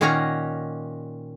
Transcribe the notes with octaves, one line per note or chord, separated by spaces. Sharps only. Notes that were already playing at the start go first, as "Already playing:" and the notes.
A#2 D#3 A#3 C#4 F#5 A#5